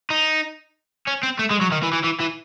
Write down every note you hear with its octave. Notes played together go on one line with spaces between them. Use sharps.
D#4
C#4
C4
A3
G#3
F#3
D#3
E3
E3
E3
E3